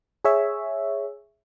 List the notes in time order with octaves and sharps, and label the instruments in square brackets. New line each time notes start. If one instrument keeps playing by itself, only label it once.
[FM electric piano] G#4 C#5 E5